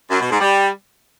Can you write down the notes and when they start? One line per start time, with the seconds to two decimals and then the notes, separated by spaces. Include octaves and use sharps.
0.10 F#2
0.20 B2
0.30 G#2
0.40 G3